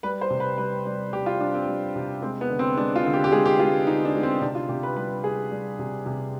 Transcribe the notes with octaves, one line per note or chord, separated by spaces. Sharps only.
G3 B4
C5
C3
B4
G3 B4
G3
G3 G4
F4
G3 D4
C4
G3
C3
G#3 C4
B3
D3
C4
G#3 D4
F4
D3
G4
G4
G#3 G#4
G4
G#3 F4
D3 D#4
D4
G#3
C4
C3 D4
F4
C3 G4
B4
G3 B4
G3 G#4
G3
C3
C3